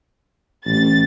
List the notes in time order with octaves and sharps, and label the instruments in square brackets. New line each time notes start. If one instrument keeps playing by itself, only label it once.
[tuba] A1 [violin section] A6